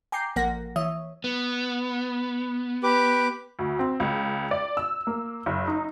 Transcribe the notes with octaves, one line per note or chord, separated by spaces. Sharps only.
G5 G#5 A#5 D6 G6 C7
A1 F3 A#3 A#4 F#5 A#6
E3 C#5 E5 D#6
B3
G4 B4 D6
D2
C4
C#2
D5
E6
A#3
F#1
D#4